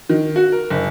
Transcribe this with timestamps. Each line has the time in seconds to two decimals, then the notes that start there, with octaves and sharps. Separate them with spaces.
0.10 D#3
0.36 F#4
0.52 A#4
0.70 F#1